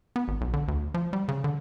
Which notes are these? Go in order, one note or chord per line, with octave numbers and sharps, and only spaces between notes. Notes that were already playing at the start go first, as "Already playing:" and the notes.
B3
G#1
B1
D3
D2
F3
G3
C#3
D3